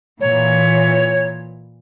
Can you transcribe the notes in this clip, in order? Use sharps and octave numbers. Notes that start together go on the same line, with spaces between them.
A#2 E3 C#5